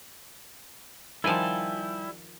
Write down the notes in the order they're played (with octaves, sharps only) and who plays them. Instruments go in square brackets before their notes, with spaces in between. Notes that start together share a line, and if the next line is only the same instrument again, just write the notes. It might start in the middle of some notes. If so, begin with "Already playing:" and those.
[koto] D#3 F3 [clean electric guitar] G3 G#5 A5 [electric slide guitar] E4